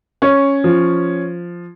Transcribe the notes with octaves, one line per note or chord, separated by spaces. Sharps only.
C#4
F3